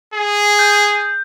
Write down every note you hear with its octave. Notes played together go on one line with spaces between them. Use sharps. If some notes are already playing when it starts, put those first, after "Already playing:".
G#4
G6